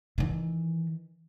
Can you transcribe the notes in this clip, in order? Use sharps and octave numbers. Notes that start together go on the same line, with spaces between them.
D#3 E3